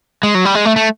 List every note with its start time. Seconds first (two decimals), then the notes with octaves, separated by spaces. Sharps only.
0.23 G#3
0.35 F#3
0.45 G3
0.55 G#3
0.65 A3
0.76 A3